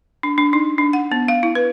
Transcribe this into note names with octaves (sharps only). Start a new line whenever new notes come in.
D4
D4
D#4
D4
F#5
B3
F5
E4
B4